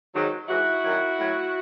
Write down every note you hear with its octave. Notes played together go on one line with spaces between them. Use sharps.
G#2 D#3 F#3
G#2 E3 E4 F#4
F#2 D#3 F#3
A2 F#3